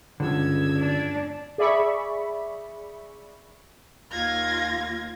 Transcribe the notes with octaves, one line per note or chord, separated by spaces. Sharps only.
C#2 G2 D3 E6 G#6
D4
G#4 D5 E5 B5 C#6
D#2 F4 G#6 A#6